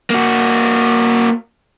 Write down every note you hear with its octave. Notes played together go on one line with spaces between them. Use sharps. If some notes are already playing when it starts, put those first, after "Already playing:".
A#3 F#4